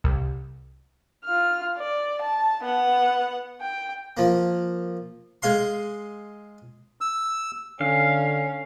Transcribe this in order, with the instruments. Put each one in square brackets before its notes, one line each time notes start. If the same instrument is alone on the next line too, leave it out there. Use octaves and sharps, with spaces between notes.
[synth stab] C2
[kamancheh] F4 F6
D5
A5
B3 F#5
G5
[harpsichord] F3 A#3
G#3 G#4 F5 C6
[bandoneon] E6
[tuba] D3 [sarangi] C#4 [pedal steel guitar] F5